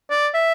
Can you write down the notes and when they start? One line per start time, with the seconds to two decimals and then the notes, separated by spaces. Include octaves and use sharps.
0.10 D5
0.34 E5